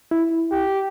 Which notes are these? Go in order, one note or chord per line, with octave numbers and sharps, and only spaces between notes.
E4
G4